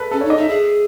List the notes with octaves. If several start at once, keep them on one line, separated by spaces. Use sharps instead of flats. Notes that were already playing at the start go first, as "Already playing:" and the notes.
Already playing: A4 B4
C#4 A4
D#4 C#5
D#5
D#4 E5
G#4 E5